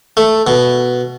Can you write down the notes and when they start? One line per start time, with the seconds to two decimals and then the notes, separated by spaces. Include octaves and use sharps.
0.17 A3
0.47 B2